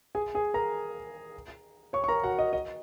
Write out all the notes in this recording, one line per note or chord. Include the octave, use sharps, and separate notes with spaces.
G#4 G#5
G#4 G#5
A#4 A#5
C#5 C#6
C#6
A#4 A#5
F#4 F#5
D#5
D#5